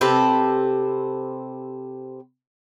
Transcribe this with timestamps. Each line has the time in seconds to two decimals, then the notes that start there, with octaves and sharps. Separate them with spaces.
0.01 C3 C4 A4 B4